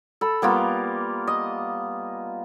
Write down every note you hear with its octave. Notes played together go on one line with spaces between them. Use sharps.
A4 B5
G3 A#3 B3 F4
D#5